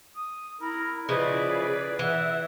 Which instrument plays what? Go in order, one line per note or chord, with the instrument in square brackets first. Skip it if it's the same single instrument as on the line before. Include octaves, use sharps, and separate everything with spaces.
[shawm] D#6
[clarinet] E4 [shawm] A#4
[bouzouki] C#3 F3 E4 [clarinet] B4 [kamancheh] D5 [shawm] D#5
[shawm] G#4
[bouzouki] E3 [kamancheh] E5 [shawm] F#5